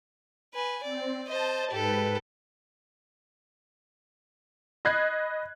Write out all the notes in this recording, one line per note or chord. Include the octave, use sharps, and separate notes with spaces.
B4 G#5
C4 D5
C5 D#5 A5
G#2 G4 A4 B4
D#5 B5 F#6 G#6 C7